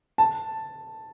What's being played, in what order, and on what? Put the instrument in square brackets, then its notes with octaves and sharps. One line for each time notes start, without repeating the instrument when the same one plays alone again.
[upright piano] A5